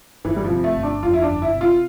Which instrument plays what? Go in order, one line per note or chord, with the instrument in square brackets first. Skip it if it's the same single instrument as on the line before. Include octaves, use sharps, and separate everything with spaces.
[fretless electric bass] G1 [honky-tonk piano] E3
[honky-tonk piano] G3
F3
[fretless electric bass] C3
[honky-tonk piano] A3
[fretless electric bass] G1
[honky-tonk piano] D4
[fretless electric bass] F2 [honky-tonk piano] F4
[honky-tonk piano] E4
D4
[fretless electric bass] G1
[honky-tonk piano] E4
[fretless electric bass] C3
[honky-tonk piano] F4